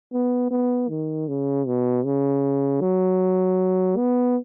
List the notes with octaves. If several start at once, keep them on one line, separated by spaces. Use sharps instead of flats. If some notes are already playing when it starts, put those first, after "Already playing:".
B3
B3
D#3
C#3
B2
C#3
F#3
B3